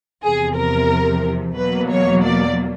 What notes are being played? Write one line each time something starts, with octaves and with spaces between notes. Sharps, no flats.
E2 C3 F3 G#4
A#4
E2 B2 F#3 A#3 B4
C#5
D5